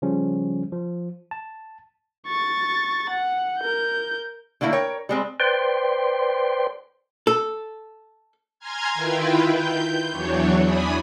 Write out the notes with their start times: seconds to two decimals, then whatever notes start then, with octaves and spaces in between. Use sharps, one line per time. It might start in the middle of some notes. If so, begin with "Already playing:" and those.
0.02 C#3 F3 G3 C#4
0.72 F3
1.31 A5
2.27 C#6 A6
3.10 F#5
3.60 A#4 G6
4.61 D3 A3 A#3 E4 A#4
4.73 A#4 C#5 G5
5.09 G3 G#3 C4
5.40 B4 C5 D5 G5 C6
7.27 A4
8.59 G#5 A#5 C6 F6 G#6
8.94 D#3 E4 F4 B4 G5
9.46 G6
10.11 E2 E3 F#3 D4 C#5
10.63 E2 D4 G#5 B5 D#6